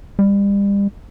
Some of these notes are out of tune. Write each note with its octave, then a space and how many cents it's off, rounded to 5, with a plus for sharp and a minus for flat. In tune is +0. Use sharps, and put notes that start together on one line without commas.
G3 +35